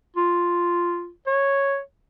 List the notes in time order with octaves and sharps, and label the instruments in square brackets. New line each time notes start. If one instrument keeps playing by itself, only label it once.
[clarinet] F4
C#5